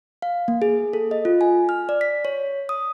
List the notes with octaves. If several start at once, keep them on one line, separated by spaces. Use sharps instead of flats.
F5
A#3
G#4
A4
D#5
F4
G#5
F6
D5
B6
C#5
D#6